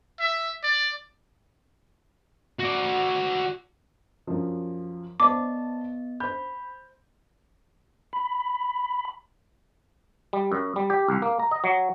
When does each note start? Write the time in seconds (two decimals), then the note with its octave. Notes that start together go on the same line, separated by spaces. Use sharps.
0.20 E5
0.63 D5
2.60 F#4 D5
4.27 F#2 F3
5.20 B3 C5 D5 D#5 A5 D6
6.20 C5 B5 G6
8.13 B5
10.33 G3
10.52 F#2
10.76 G3
10.90 G4
11.08 C2
11.22 A#3
11.39 A#5
11.51 D#5
11.64 F#3